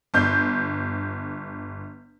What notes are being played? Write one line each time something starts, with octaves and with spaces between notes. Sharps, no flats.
G1 G6